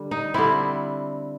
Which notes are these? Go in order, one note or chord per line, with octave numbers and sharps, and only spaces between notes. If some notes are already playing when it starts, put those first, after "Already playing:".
Already playing: D3 G3
D#4
D3 G3 C4 E4